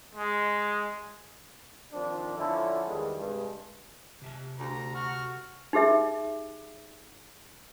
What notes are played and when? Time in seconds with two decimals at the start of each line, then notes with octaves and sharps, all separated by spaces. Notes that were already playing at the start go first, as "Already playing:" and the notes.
0.15 G#3
1.92 D#3 F3 C4 D4
2.36 D3 F3 C#4 D4 E4
2.87 E2 D#3 G3 G#3
3.17 G2 C3 G#3
4.22 C3 E5 A5
4.59 D2 A#5
4.95 F#4 F6
5.73 D#4 G4 G#4 E5